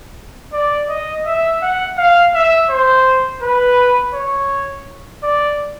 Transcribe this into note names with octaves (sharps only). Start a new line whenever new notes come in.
D5
D#5
E5
F#5
F5
E5
C5
B4
C#5
D5